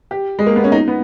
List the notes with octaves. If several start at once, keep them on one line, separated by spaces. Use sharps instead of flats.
G4
G#3
A#3
B3
C#4
D#4
B3